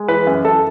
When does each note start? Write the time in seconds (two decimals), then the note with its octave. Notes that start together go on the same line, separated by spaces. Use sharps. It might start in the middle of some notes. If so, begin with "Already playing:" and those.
Already playing: G#3
0.08 E3 B4
0.27 F#2
0.45 F#2 A4